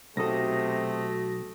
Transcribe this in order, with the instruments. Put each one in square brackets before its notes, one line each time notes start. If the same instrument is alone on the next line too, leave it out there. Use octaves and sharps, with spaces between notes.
[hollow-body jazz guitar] B1 A4 [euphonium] C3 [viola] A3 [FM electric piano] F#4 D#6 A#6